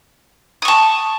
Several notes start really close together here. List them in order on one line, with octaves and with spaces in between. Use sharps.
D#6 C#6 A5